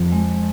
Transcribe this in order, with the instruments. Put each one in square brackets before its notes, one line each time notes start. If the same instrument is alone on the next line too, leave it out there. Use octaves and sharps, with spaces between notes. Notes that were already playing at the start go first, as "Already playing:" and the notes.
Already playing: [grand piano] F2
[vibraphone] G#3